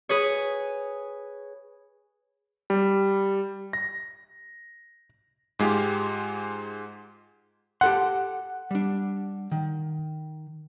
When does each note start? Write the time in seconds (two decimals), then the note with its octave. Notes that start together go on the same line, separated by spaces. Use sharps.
0.09 G#4 B4 C#5
2.70 G3
3.73 A#6
5.59 G#2 G#3 F4 G4
7.81 G4 A4 F#5 C6
8.71 G3 D4
9.51 D#3